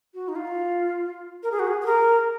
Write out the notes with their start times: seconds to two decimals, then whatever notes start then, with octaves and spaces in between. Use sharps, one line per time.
0.14 F#4
0.28 D#4
0.35 F4
1.43 A#4
1.52 G#4
1.59 F#4
1.67 G#4
1.81 G#4
1.86 A#4